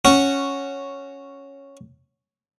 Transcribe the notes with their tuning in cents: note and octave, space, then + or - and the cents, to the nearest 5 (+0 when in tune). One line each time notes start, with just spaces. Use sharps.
C#4 -5 F#4 +0